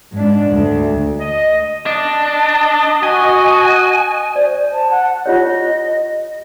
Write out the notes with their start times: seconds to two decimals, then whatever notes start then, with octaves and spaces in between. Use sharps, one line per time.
0.13 G#2 D4
0.52 D2
1.19 D#5
1.86 D4 D#5
3.03 F#4 G#5
4.36 C5 D5
4.73 A5
4.91 F#5
5.26 F4 G4 C#5 D#5